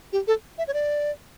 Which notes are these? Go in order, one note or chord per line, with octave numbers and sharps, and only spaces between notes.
G4
A4
E5
C#5
D5